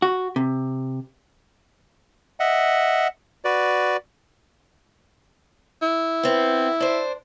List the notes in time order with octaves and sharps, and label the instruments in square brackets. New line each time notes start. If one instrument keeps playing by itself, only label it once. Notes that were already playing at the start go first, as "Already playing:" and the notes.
[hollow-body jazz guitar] F#4
C3
[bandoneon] D#5 E5 F#5
F#4 B4 D5
[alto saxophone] E4
[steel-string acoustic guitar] B3 C4
D4 C5